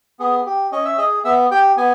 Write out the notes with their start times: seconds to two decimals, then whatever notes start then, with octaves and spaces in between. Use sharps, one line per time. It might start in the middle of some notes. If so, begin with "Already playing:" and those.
0.19 B3 G#4
0.46 G4
0.72 C#4 D#5
0.85 E5
0.98 G#4 D#5
1.24 B3 E5
1.51 G4 G5
1.77 B3 G#5